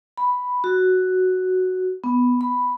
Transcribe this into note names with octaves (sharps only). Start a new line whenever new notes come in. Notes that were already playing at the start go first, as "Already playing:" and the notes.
B5
F#4
B3
B5